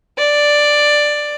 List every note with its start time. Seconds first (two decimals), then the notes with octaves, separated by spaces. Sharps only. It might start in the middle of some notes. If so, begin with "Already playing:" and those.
0.18 D5